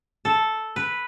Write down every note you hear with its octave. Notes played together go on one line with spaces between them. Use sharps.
A4
B4